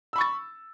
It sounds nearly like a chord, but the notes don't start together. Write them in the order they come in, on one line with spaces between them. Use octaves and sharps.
E6 B5 C#6 A6